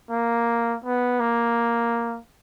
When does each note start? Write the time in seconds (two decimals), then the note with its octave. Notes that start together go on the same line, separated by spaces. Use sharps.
0.10 A#3
0.84 B3
1.20 A#3